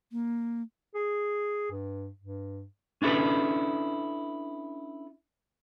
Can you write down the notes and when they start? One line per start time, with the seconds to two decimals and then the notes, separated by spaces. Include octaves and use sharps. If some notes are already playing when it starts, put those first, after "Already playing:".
0.12 A#3
0.95 G#4
1.71 G2
2.20 G2
3.02 C#4 D4 E4 A4 B4